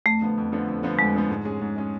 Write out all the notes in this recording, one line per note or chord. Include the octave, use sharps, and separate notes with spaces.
F2 A3
D3 F3 B3
F2
D3 F3 B3
F2
D3 F3 B3
F2 G#3
D3 F3 B3
G#2
G#3 C#4 G#4
G#2
G#3 C#4 G#4